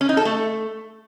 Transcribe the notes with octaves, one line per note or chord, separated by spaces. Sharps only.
C#4
D#4
A4
A3